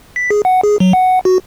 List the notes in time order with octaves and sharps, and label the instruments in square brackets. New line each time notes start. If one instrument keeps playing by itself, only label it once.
[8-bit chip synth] B6
G#4
F#5
G#4
F#3
F#5
F#4